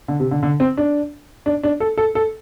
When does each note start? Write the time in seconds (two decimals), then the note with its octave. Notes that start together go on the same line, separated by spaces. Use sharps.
0.08 D3
0.20 C3
0.31 D3
0.43 D3
0.60 C4
0.77 D4
1.46 D4
1.63 D4
1.80 A4
1.98 A4
2.15 A4